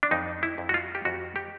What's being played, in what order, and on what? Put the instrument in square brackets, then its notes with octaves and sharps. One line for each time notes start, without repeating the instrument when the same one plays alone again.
[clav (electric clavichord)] D4
F2 D#4
E4
F2
F#4
F4
G4
F2 F#4
G4